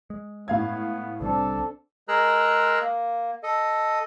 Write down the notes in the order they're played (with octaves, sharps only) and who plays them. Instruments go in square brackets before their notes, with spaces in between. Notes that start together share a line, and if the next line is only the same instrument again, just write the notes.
[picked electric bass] G#3
[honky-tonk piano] A2 F5 G#6 [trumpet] B3
[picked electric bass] C2 D3 G3 [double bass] C4 D4 [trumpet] A4
[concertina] G#3 G#4 A#4 A#5 E6 F#6
A#3
A4 D#5